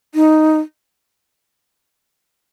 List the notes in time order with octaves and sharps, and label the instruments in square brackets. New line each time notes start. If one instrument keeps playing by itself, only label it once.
[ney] D#4